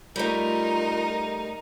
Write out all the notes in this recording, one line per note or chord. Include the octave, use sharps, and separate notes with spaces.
G3 A3 D#4 F4 A#4